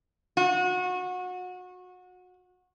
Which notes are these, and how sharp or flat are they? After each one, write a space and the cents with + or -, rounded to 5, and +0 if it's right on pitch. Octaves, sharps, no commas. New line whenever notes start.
F#4 -25